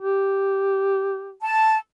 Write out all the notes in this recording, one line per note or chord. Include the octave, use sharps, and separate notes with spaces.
G4
A5